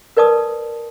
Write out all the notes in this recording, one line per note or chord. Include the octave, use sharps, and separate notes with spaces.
A#4 B4 D5 A5 D#6